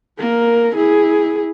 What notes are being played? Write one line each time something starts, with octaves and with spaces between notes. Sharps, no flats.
A#3 A#4
E4 G#4